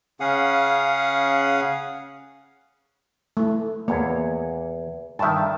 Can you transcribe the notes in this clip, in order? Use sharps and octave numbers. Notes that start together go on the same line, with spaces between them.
C#3 C#4 G#4 F5 F#5 D#6
A3 E4
E2 A#3 C#5
G2 D#3 E5 A5